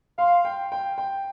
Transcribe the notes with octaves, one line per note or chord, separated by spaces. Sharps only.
F5 C6
G5
G5
G5